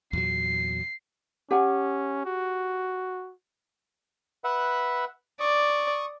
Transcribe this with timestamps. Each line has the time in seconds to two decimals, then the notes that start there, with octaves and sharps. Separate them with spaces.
0.13 E2 A#2 F#3 C7
1.51 C#4 G4 F#5 G#5
2.25 F#4
4.44 B4 E5 F#5
5.40 D5 C#6 D#6